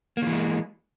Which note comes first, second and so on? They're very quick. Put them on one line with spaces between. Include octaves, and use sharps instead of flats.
A#3 D#3 E3 G#3